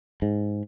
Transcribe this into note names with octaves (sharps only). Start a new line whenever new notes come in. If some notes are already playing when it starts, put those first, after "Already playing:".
G#2